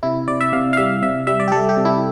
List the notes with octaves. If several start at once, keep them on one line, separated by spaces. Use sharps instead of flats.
C3 E4
C3 D5
E5
C3 F5
F5
G3 E5
C3 E5
G3 E5
D5
G4
G3 A4
G4
C3
E4